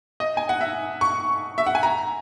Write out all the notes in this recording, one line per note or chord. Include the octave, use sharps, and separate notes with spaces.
D#5
G#5
F#5
E5
C#6
E5
F#5
G#5
A#5